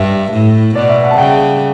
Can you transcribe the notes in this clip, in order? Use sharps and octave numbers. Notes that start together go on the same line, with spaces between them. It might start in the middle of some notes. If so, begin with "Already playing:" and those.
Already playing: G2 E5
A2
B2 D5
E5
F#5
A5
C#3 G5